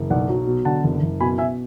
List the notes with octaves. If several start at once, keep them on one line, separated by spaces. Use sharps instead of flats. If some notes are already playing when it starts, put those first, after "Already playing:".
Already playing: F#1
B1 D5 F#5
F#3
B2
D3 F#5 A5
F#1
F#1
B2 G#5 B5
B2 E5 G#5